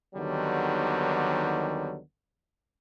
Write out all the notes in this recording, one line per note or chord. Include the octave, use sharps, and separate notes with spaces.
D#2 D3 D#3 F#3 G3 B3